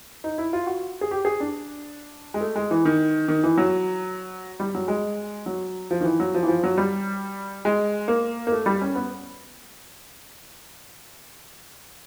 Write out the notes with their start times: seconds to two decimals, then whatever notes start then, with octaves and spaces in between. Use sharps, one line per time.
0.24 D#4
0.38 E4
0.53 F4
0.67 F#4
1.01 G#4
1.11 G4
1.25 G#4
1.40 D4
2.34 G#3
2.41 A3
2.56 G#3
2.71 E3
2.85 D#3
3.28 D#3
3.44 E3
3.58 F#3
4.60 G3
4.75 F#3
4.88 G#3
5.46 F#3
5.91 F3
6.01 D#3
6.04 E3
6.20 F#3
6.34 F3
6.43 E3
6.48 F3
6.64 F#3
6.78 G3
7.65 G#3
8.08 A#3
8.47 A#3
8.52 A3
8.66 G3
8.82 C#4
8.95 B3